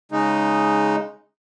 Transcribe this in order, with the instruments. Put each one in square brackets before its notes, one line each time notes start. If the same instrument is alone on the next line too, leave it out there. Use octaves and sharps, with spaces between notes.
[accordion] C#3 G#3 D#4